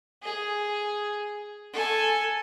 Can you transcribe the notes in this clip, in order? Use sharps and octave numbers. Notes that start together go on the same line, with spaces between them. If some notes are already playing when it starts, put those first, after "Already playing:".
G#4
A4 G#5